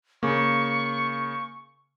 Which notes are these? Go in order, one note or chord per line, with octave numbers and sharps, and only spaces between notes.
C#3 A#3 C#6